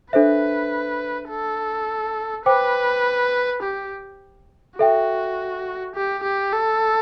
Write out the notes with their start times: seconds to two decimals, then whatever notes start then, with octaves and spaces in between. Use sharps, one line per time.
0.13 D4 A4 B4 C5 E5
1.30 A4
2.46 B4 C5 G5 D6
3.63 G4
4.79 F#4 A4 E5 G5
5.95 G4
6.24 G4
6.53 A4